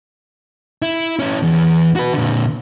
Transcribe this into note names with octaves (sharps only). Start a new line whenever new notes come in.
E4
C#4 E4
E2
F#4 B4
A#2 D3